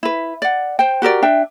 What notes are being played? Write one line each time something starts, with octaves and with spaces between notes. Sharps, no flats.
E4 B4
D5 F#5
C5 G5
F#4 G4 A#4 D5
D4 E5 G5